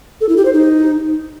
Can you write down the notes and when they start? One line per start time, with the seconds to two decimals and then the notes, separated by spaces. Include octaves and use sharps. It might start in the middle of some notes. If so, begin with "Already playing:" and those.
0.21 A4
0.29 E4
0.37 G4
0.45 C5
0.53 D#4